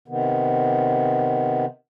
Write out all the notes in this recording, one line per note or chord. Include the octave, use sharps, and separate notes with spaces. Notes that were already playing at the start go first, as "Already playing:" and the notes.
C3 D#3 B3